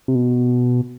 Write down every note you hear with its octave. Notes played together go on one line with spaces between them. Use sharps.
C3
B2